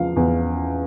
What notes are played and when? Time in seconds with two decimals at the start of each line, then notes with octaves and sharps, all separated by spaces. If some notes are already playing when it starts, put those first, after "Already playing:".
Already playing: E2 C#3 F3 F5
0.16 E2